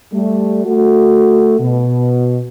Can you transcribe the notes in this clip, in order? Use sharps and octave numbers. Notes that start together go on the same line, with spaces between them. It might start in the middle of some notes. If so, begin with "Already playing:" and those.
G3 A3
A3 F#4
B2